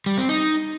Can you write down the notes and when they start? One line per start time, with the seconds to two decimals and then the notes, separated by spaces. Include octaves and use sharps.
0.06 G3
0.18 C4
0.29 D#4